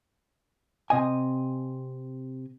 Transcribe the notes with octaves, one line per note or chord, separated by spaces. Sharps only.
C3 D#5 G#5